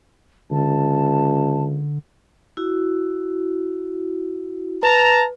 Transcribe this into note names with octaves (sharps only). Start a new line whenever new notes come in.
C#2 D3 A5
E4 F#4
B4 A5 A#5